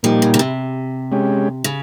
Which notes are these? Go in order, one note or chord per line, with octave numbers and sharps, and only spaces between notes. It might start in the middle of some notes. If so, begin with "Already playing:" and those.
A#2 F3 G3 A#3 D#4 G4
C#3
C#3
C3
G#3 C#4 G4
C#3